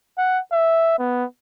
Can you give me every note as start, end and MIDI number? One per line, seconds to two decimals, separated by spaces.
0.18 0.39 78
0.53 0.97 76
0.99 1.25 59